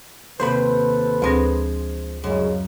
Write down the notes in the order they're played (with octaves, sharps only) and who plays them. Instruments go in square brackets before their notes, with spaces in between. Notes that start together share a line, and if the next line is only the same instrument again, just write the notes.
[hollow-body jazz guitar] D#2 C3 B5 [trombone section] A4 B4 [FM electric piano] C5
[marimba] D2 C4 A#6 [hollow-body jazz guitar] F3 G#3
[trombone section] C2 C#3 G#3 [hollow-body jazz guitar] F#2